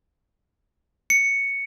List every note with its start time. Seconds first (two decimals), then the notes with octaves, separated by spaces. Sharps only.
1.10 C#7